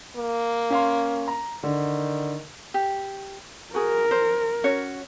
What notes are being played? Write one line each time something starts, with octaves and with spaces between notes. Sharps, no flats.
A#3
C#4 F5 C6
A#5
D3 D#3
G4
F#4 G#4 A#4
C5
C#4 F#4 C#5